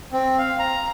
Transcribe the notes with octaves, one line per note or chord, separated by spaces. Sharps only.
C4
F5
A#5